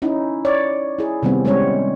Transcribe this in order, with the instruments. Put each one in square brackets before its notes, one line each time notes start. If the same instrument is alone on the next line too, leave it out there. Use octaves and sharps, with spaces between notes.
[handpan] C#4 D#4 E4
C#5 D5
E4 G#4
C3 D#3 G3 B3 C4
G3 G#3 C4 C#4 C#5